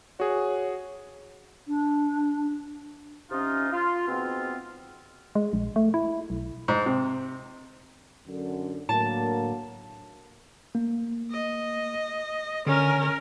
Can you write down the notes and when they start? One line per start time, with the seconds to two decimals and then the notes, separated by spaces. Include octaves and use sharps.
0.20 F#4 G#4 C#5
1.68 D4
3.31 C3 C#4 D#4 F4
3.72 F4
4.08 G#2 B2 B3 C4 F4
5.35 G#3
5.53 A#1
5.76 A3
5.94 E4
6.30 B1
6.68 G#2
6.86 C3
8.26 F#2 D3
8.89 A2 D3 F#3 A#3 A5
10.75 A#3
11.31 D#5
12.67 D3 C#4 A#4